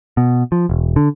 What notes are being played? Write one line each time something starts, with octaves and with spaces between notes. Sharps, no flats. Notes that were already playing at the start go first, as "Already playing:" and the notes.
B2
F3
E1
D3